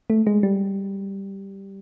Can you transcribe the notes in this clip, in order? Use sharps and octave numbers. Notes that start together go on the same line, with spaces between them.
A3
G#3
G3